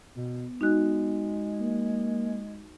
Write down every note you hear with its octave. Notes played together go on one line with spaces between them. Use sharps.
B2 B3
G#3 D#4 F#4 F#6
A#3